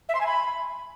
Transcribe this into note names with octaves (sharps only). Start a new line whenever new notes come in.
E5
C6
G#5
B5